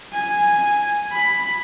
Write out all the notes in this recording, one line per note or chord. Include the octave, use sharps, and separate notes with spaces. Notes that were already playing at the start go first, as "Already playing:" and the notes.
G#5
B5